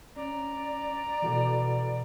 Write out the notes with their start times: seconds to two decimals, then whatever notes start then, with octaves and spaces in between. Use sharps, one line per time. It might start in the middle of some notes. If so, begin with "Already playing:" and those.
0.16 C#4 D5 A#5
1.22 B2 E3 F#4 A4